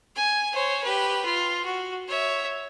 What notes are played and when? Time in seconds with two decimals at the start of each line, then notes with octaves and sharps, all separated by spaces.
0.16 G#5
0.53 C5 C#5
0.83 G4 B4
1.25 F4
1.65 F#4
2.08 C#5 E5